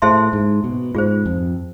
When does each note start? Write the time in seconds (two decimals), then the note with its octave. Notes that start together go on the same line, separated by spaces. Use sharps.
0.02 A2 G#4 C5 E5 A5 C6
0.33 G#2
0.64 B2
0.95 G#2 F4 G#4 C5
1.26 F2